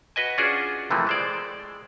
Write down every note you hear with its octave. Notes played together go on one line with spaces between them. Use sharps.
F#4 B4 D#5 G#5
C#4 D4 F4 F#4 G#4 D5
C3 E3 F3 A3 A#3
G#3 C5 D5